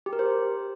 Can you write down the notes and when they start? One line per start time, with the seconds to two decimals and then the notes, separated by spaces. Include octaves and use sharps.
0.06 G4
0.13 A#4
0.19 C5